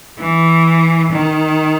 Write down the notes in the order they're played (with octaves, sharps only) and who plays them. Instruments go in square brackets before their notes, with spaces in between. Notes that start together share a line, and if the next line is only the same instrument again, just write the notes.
[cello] E3
D#3